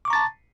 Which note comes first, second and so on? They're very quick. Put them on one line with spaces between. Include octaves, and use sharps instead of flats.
D6 C#6 A#5 A6 A5